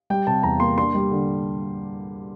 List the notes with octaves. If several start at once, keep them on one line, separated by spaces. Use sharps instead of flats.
G3 G5
C3 A5
E2 A#5
A#3 C6
D4 C6
G3
D3